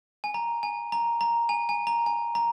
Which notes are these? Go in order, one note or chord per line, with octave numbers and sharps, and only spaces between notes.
G#5
A#5
G#5
A#5
A#5
G#5
G#5
A#5
G#5
A#5